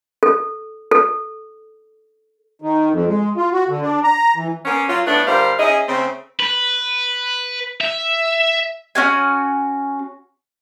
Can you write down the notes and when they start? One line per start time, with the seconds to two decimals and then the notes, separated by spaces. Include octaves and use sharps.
0.23 A4
0.92 A4
2.62 D#3
2.92 F2
3.07 G#3
3.37 F4
3.53 F#4
3.68 D3
3.81 D4
4.04 A#5
4.36 E3
4.65 A#3 B3 C#4
4.88 F#3 F4
5.06 A2 A3 B3 D4
5.27 D3 G3 A#4 C5 F5
5.58 C#4 E4 G#4 D#5
5.88 C#3 A3 C4
6.40 B4
7.81 E5
8.95 C#4 F#4 G#5